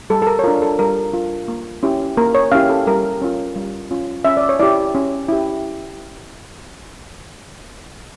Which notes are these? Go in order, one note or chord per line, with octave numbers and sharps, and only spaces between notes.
G3 A4
A4
A#4
C#5
D4 F4 A#4
A4
G3 A#4
D4 F4
A#3
C#4 E4 G4
A#3 A#4
C#5
C#4 E4 G4 F5
A4
G3 A#4
C#4 F4
G3
C#4 F4
C#4 E5
D5
C#5
E4 G4 D5
C#4
E4 G4